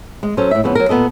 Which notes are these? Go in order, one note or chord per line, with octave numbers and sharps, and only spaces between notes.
G#3
F#3 C#4 A4 C5
A2 E5
F2 C#3 G#3 B3 E4
F#3 A#4
A#2 B3 A4 D#5